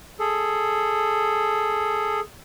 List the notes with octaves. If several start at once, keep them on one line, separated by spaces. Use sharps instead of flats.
G#4 A4